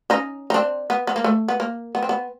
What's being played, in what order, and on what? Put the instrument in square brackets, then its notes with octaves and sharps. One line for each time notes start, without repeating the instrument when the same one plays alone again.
[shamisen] C#4 D#4
D#4
C4 D4
B3
B3
A#3
A3
B3
A#3
B3
C4
B3